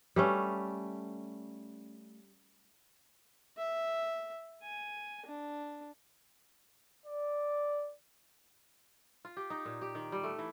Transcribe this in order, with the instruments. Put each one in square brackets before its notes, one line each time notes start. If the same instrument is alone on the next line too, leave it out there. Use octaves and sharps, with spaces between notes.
[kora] G3 A3 C#4
[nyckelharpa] E5
G#5
D4
[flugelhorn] D5
[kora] F4
G4
D#4
A#2
G4
D#3
G3
A3
E3